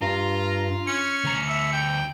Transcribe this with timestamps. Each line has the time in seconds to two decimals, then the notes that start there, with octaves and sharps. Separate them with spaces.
0.02 G2 F4 A#5
0.87 C#4 C#7
1.24 D2 A#5
1.48 E5
1.73 G5